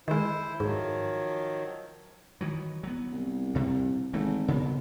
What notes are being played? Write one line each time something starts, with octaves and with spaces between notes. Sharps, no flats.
D#3 G#3 E4 C5
G#2 D#3 F3 F#3
D#3 E3 F#3
F#3 B3
C2
D2 C3
G#1 E3 A3
B1 C#3